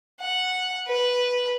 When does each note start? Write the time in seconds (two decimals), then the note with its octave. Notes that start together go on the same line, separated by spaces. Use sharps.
0.21 F#5
0.88 B4